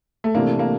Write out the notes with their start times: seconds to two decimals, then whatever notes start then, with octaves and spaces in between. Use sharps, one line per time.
0.24 A3
0.35 C3 E3 A3 A#3 D4
0.59 A#3